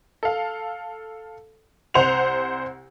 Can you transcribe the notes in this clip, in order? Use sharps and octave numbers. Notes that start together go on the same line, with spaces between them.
A4 F5
C2 C5 F#5 F7